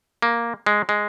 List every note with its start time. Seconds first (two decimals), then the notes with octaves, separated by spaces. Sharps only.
0.22 A#3
0.66 G#3
0.89 G#3